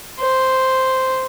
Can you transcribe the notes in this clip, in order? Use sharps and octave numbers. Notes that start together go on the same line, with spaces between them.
C5